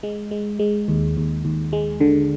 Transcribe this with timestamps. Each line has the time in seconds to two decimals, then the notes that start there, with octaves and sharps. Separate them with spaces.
0.03 G#3
0.31 G#3
0.59 G#3
0.88 D#2
1.17 D#2
1.45 D#2
1.73 G#3
2.00 D3